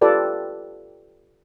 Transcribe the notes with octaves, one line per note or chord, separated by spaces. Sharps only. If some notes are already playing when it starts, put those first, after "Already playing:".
F4 G4 A4 B4 D5 G5